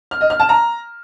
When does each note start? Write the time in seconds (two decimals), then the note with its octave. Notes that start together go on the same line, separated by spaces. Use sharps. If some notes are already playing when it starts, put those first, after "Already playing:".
0.11 F6
0.21 D#5
0.30 F6
0.40 A5
0.49 A#5